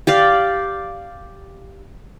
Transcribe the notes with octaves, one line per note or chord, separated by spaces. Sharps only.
G4 D5 F5